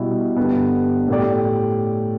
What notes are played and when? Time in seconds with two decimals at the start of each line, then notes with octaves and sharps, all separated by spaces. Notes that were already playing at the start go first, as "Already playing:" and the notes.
Already playing: B2 G3 E4
0.37 G2 D3 G3 B3
1.08 A2 A3 G4 D5